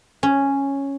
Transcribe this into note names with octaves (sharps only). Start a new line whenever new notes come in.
C#4